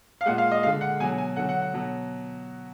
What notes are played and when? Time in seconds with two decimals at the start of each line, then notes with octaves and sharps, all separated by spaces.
0.21 F5
0.26 A#2 G#3 F#5
0.38 F5
0.51 D#5
0.63 D3 G#3 F5
0.81 F#5
1.00 B2 F#3 G#5
1.18 G#5
1.36 D3 F#3 F#5
1.49 F#5
1.62 F#5
1.74 B2 F#3